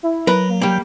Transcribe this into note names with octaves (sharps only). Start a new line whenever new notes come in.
E4
F#3 A#4 B4
A#3
G3 A#3 G5